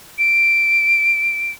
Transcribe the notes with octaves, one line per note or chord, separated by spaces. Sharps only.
D7